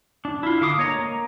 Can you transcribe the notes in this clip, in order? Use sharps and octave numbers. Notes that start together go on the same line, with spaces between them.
D4
E4 F4
D3 F5 D6 D#6
A#3 C#5 D#5 A#5
A#3